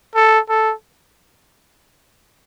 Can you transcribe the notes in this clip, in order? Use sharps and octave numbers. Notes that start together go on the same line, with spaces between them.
A4
A4